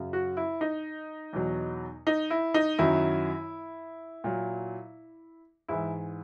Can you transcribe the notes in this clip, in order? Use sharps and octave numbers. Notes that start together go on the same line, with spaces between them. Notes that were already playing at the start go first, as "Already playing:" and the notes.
Already playing: F#2 C#3 F#3
F#4
E4
D#4
E2 B2 F#3
D#4
E4
D#4
F#2 D#3 F#3 E4
A#2 F#3
G#2 E3 E4